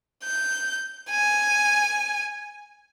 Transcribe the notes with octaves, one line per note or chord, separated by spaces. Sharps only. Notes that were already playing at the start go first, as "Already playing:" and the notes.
G6
G#5